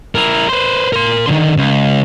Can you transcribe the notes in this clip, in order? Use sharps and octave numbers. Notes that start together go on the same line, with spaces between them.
E4 A#4
B4 C5
A#4 C6
D3 D#3
C#2